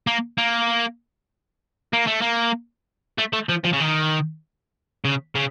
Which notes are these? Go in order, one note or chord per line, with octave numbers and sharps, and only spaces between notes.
A#3
A#3
A#3
A3
A#3
A3
A3
F3
F3
C#3
D#3
C#3
C#3